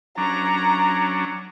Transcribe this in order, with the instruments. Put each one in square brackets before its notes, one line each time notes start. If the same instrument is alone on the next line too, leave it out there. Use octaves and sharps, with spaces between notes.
[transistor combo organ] F#3 C#4 D4 [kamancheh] A#5